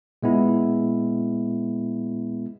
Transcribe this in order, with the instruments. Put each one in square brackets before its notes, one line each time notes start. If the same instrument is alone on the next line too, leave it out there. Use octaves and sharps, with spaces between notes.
[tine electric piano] A#2 G#3 B3 E4